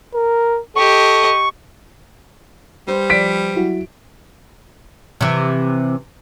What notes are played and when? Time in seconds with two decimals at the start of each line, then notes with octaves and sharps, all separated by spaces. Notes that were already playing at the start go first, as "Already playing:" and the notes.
0.14 A#4
0.76 G4 A4 D#5 C#6
2.88 G3 B4 C5
3.10 F3 D5 B6 D7
3.55 F#3 E4 F#4
5.21 C3 E3